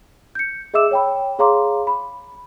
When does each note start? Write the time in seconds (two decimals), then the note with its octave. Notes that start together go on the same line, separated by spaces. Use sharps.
0.35 G6 C#7
0.74 G#4 D#5 E5 D6 E6 E7
0.91 C#5 G5 B5
1.39 G#4 C#5 F5 A#5 C6 D6
1.87 B5